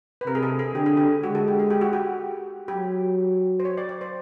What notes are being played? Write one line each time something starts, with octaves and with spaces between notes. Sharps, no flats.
B4
C3 A#4
G#4
A4
G#4
D3 G4
G#4
G4
G#3 F#4
A4
G4
G#4
G4
F#4
G4
F#3 G4
C5
C#5
D5
D5
C5